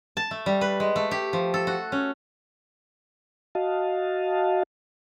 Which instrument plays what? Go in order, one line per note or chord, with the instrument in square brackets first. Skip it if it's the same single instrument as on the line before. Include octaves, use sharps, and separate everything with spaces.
[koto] A5
A3
G3
B4
G#3
A3
G4
F3
A4
F#4
C#4
[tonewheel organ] F#4 D#5 F5 A5